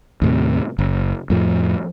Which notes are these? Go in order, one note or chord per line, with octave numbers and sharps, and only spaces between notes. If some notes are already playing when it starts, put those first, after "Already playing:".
D#2 A2 C3
F#1
F2 A2 F3